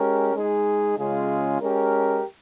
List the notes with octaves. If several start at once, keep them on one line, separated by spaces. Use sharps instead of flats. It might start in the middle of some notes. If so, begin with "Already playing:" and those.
Already playing: G#3 C#4 G4 A#4
G#3 D#4 G#4
C#3 G#3 C#4 F4 G#4
G#3 C#4 G4 A#4